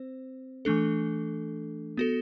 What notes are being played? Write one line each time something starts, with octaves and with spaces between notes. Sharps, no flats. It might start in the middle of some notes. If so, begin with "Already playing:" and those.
Already playing: C4 C5
E3 A3 D4 A4
B3 F#4 A4